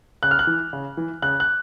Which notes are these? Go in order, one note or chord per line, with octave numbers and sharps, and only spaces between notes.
C#3 F#6
F6
F#6
E3
C#3
E3
C#3 F#6
F#6